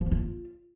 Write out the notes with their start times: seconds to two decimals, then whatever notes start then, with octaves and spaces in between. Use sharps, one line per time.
0.01 F3
0.06 B3
0.11 F4